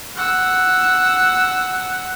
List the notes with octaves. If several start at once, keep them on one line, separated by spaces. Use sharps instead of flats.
F#5 E6